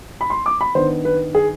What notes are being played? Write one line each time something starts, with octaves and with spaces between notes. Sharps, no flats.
B5
C6
D6
B5
D#3 B3 D4 C5
B4
G#4